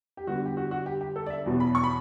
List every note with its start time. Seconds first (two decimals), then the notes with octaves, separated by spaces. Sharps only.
0.17 G4
0.27 G2 D3 G3 B3 F#4
0.46 G4
0.57 F#4
0.71 F#4
0.86 G4
1.01 G4
1.16 A4
1.26 D5
1.30 E5
1.46 E2 B2 F#3 B3
1.60 B5
1.75 C#6
1.84 B5